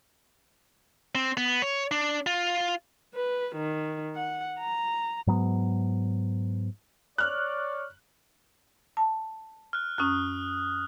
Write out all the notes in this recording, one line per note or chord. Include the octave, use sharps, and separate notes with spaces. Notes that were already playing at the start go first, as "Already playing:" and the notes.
C4
B3
C#5
D4
F4
B4
D#3
F#5
A#5
G#2 F#3 B3
C#5 D5 F6 F#6
A5
F6 F#6
F#2 C#4 D#6 F6 F#6